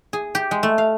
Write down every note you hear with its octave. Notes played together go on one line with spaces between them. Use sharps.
G#4
G4
G#3
A3
F5